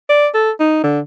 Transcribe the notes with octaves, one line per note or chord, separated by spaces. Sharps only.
D5
A4
D#4
D3